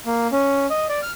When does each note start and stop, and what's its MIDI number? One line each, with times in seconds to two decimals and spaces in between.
0.06 0.27 58
0.32 0.67 61
0.70 0.87 75
0.89 1.00 74
1.02 1.11 89